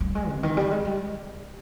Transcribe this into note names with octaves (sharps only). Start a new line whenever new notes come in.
G3
G#3
C3
D#3
G3
G#3
G3